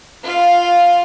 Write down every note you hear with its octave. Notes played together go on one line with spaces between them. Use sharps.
F4 F5